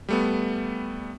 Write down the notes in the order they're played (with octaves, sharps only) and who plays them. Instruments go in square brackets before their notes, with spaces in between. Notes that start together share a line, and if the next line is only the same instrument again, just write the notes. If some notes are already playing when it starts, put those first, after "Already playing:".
[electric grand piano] G3 A3 B3